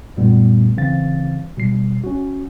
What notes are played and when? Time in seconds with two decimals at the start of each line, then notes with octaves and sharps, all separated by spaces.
0.17 F#2 A#2 G3 A3 B3
0.77 C#3 E3 C4 F5 A6
1.57 B2 G3 C7
2.04 C#4 F#4